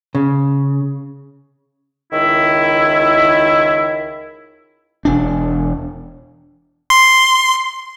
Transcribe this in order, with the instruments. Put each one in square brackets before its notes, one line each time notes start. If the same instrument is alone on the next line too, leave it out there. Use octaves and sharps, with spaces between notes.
[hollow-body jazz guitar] C#3
[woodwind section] C#2 D#3 E4
[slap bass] E1 D4
[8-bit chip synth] C6